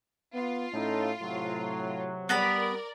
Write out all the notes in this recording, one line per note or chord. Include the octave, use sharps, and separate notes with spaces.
B3 F4
A2 C#4 D#4 A4
A2 C3 F#3
G3 B3 A#4 D5 A#5 B5